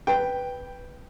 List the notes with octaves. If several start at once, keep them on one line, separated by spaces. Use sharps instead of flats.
B4 G5